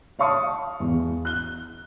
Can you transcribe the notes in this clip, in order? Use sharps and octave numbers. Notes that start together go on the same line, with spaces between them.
C#5 F5 A5 C#6 D#6
E2
F#6 G7